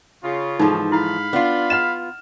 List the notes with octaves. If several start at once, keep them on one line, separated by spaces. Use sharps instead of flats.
C#3 F4
G#2 E3 F3 D#4 A4
E4 F5 B5
B3 D4 F4
D#5 F#5 F6 E7